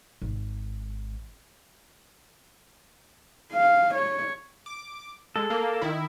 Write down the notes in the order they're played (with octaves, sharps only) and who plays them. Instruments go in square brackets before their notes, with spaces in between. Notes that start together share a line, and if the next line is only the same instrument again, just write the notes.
[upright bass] G#1
[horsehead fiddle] F5
C#5
[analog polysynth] D6
[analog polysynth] G#3 [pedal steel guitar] A4
[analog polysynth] A#3
D#3 E4